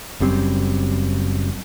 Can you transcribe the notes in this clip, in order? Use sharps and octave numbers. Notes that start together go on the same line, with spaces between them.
F#1 F#2 G3 C4